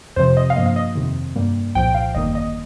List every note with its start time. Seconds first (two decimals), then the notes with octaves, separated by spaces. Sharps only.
0.16 F2 C3 F3 C5
0.37 D#5
0.50 F5
0.56 G2 F3 A#3 D#5
0.66 F5
0.76 D#5
0.95 F2 C3 D#3
1.36 G2 G3 A#3
1.75 C2 A#2 F3 G5
1.95 F5
2.15 G1 F2 D#3 G3 A#3 D#5
2.35 D#5